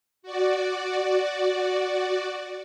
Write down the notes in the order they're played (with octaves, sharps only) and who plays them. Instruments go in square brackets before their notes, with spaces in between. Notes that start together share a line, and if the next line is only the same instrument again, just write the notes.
[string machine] F#4 D5